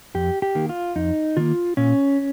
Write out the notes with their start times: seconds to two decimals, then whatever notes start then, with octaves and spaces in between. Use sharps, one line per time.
0.14 F2 G4
0.42 G4
0.55 D#3 A#3
0.69 F4
0.96 F2 D#4
1.37 D#3 A#3 F4
1.77 A#2 C#4